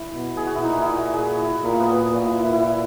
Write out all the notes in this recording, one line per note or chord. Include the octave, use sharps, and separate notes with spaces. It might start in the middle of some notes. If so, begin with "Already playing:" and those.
Already playing: E4
B2
G#4
F#4
E4
A#2 D#4
E4
F#4
G#4
E4
A#2 A#3
B3
A#2 F#4
E4
E4
E4
E4